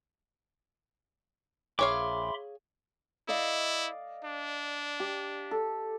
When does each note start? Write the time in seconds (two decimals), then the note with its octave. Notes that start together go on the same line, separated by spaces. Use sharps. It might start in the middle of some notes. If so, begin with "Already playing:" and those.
1.79 A#1 G#4 C#5 E5 F5 B5 C6 D6
3.28 E4 D5 D#5 F5
4.25 D4
5.00 G4
5.51 A4